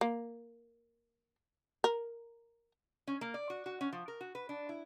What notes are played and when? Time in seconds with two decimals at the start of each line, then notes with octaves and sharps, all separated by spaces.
0.01 A#3
1.84 A#4
3.07 C#4
3.21 A#3
3.34 D5
3.50 F#4
3.66 F#4
3.81 C#4
3.93 F3
4.08 A#4
4.21 F#4
4.35 B4
4.49 D4
4.69 E4